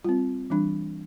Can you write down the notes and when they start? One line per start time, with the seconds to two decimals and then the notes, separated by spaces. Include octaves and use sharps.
0.05 G3 C4 F4
0.50 E3 G3 D4